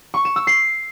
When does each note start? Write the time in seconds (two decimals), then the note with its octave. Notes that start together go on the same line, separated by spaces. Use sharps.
0.14 C#6
0.25 E7
0.36 E6
0.47 C7